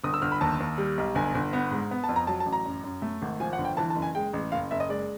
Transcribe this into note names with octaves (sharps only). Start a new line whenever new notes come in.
G1 D#6
E6
G1 F6
B5
D#2 A5
D#2
G3
B1
G1 G#5
G1
B3
G#2
B3
A5
F2
A#5
F#3 A5
A5
A1
A#5
F#2
F#2
A3
G#1
F3 G#5
F#5
G1
G5
E3 A5
A5
F#1
G#5
G#3 G5
A1
F#1 F5
F#1 E5
D#5
G#3 D5